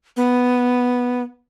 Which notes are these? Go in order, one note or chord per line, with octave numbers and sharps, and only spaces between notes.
B3